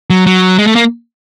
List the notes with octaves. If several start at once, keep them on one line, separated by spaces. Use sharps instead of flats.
F#3
F#3
G#3
A3
A#3